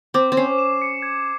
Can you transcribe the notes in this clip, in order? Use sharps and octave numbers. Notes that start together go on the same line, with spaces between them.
C4 D6
C4
C#4 C7
E7
C#7
G#6